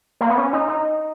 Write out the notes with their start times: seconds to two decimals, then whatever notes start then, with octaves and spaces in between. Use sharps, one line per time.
0.21 A#3
0.30 B3
0.38 C#4
0.53 D#4
0.68 D#4